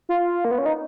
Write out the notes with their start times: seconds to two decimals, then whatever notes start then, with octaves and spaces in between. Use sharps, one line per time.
0.09 F4
0.45 A#3
0.51 B3
0.58 C#4
0.65 D#4